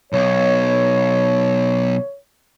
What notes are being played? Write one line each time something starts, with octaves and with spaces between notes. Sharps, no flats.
B1 C#5